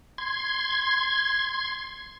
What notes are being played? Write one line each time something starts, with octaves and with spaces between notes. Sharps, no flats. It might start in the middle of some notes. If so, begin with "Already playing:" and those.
C6 G#6